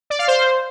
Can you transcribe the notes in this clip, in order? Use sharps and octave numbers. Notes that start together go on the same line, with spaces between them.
D5
F5
C5